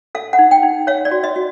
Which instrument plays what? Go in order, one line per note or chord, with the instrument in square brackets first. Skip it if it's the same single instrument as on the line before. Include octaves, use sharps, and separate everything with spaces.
[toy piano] A4 F5
F#5
D#4
G5
D#4
C#5 F5
D5
F#4
D#5
F#4